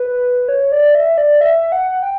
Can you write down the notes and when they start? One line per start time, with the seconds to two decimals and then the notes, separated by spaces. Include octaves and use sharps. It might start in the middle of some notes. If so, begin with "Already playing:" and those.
Already playing: B4
0.48 C#5
0.72 D5
0.95 E5
1.18 D5
1.41 E5
1.72 F#5
2.03 G5